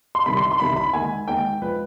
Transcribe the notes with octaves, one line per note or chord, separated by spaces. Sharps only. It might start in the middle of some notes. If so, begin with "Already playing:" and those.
C6
C2 C3 D#3 G3 B5
C6
C6
C2 C3 D#3 G3 B5
B5
D#2 D#3 G#3 G#5
D#2 D#3 G#3 G5
F3 G#3 B4